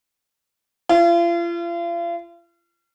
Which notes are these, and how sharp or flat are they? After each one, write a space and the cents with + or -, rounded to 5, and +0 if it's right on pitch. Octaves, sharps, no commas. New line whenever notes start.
F4 -40